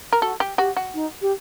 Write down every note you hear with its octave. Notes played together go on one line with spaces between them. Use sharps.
A#4
F#4 A4
G4
F#4 G4
F#4
D#4
G4